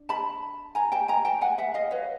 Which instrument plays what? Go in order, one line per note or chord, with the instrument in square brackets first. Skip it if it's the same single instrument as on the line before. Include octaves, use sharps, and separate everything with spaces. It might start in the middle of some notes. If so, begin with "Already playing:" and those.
Already playing: [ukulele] D4
A5 B5
G#5 A#5
G5 A5
G#5 A#5
G5 A5
F#5 G#5
E5 F#5
D#5 F5
B4 C#5